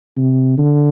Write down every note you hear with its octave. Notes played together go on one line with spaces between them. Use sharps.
C3
D3